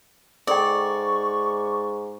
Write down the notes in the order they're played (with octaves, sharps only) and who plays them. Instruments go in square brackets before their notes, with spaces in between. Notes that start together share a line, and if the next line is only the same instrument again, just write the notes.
[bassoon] G#2 [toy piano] A4 G5 [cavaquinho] D5 [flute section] C#6